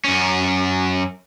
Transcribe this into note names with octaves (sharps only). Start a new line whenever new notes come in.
F#2 C#4